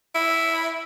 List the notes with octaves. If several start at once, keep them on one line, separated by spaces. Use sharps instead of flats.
E4